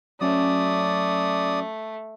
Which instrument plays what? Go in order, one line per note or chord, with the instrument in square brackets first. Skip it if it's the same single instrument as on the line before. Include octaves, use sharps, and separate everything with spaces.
[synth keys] F#3 C#4 [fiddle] A3 [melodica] D5 D#6